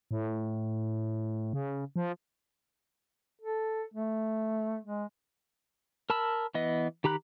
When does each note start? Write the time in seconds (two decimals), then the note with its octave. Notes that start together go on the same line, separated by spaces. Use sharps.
0.11 A2
1.53 C#3
1.96 F3
3.42 A4
3.94 A3
4.85 G#3
6.10 A#4 A5 B5 E6
6.55 E3 B3 D#5
7.04 D#3 G4 A#5 B5 F#6